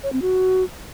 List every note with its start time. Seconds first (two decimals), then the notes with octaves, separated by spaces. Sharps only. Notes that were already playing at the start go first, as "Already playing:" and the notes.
0.03 C#5
0.13 C4
0.22 F#4